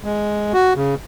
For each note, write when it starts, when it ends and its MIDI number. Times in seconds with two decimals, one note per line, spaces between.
0.05 0.53 56
0.53 0.73 66
0.75 0.95 49